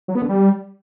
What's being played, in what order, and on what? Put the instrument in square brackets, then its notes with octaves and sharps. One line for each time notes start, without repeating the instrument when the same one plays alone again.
[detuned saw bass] F#3
B3
D3
G3